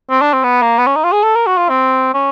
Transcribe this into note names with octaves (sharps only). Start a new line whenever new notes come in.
C4
D4
C4
B3
A#3
B3
C#4
D#4
F4
G#4
A4
A#4
F#4
F4
C4
C#4